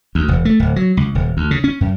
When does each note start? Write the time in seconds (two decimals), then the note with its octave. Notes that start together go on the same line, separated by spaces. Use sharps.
0.15 D2
0.28 E1
0.45 A3
0.60 D1
0.76 F#3
0.97 C#2
1.15 D#1
1.37 D2
1.51 C#3
1.64 C#4
1.81 F#2